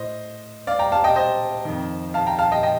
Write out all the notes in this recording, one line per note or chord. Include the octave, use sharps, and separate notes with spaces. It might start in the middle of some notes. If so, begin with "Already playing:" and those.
Already playing: A2 C5 D#5
D5 F5
G5 A#5
F5 A5
D#5 G5
C5 D#5
F2 D#3
F5 A5
G5 A#5
F5 A5
D#5 G5
D#5 G5